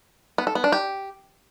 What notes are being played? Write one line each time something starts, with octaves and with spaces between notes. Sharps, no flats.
B3
A4
B3
D4
G4